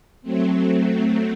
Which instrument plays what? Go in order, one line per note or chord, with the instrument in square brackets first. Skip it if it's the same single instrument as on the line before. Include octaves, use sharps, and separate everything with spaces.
[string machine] F#3 A3 C4